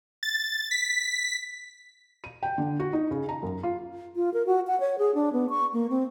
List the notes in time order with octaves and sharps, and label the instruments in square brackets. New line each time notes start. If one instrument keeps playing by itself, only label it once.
[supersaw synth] A6
B6
[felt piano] D#7
G5
D3
F#4
D#4
C#3
A#5
F#2
F4
[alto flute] F4
A#4
F#4
F#5
C#5
G#4
D4
B3
C#6
A#3
C4